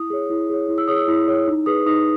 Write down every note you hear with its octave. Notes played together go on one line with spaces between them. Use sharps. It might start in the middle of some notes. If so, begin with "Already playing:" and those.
Already playing: E4 D#6
G#4 C#5
E4
G#4 C#5
E4
E6
G#4 C#5 D#6
E6
E4
G#4 C#5
D#4
G#4 B4 D#6
D#4 D#6